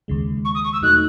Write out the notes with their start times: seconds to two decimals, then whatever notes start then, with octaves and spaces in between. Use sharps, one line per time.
0.08 D#2 C#3 G#3
0.44 C#6
0.54 D#6
0.64 C#6
0.73 E6
0.81 E2 B2 F#3 A3 D#4 F#6